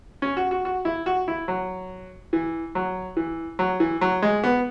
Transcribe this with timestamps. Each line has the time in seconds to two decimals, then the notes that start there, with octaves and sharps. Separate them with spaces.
0.22 C#4
0.37 F#4
0.51 F#4
0.65 F#4
0.85 E4
1.06 F#4
1.28 E4
1.48 F#3
2.33 E3
2.75 F#3
3.17 E3
3.59 F#3
3.80 E3
4.01 F#3
4.22 G#3
4.44 B3